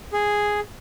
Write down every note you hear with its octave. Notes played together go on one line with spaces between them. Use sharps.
G#4